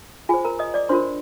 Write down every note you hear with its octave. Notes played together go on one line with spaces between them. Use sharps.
F4 G#4 C5 G#5
A#4 A#5
D#5 D#6
D5 D6
D4 F4 A#4 C5 C6